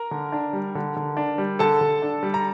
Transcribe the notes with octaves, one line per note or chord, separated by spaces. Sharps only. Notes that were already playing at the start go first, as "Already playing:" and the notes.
Already playing: A#4 A#5
D3
D4
G3
D3
D3
D4
G3
D3 A4 A5
D3
D4
G3
A#5